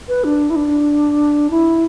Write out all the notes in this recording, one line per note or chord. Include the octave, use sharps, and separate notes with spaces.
B4
D4
E4
D4
E4